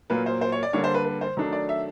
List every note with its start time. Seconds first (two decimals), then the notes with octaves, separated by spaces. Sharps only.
0.10 A#2 F#3 A#3 B4
0.26 C5
0.41 C5
0.52 C#5
0.63 D5
0.73 D3 G3 A#3 D4 C#5
0.84 C5
0.94 B4
1.05 B4
1.21 C5
1.37 D#3 F#3 A3 D4
1.53 D5
1.69 E5